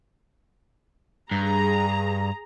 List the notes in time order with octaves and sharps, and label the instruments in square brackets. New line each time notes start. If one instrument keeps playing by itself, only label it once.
[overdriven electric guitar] G2 [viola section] G#4 A#5